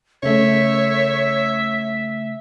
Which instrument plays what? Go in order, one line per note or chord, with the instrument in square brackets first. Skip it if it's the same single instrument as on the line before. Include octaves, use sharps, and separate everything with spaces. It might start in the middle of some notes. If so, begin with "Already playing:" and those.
[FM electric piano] C#3 A3 [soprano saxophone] C#5 [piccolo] E5